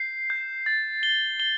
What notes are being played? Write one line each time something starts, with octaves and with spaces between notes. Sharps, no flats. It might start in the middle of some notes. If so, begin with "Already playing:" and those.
Already playing: G6 C7
G6
A6
G7
G7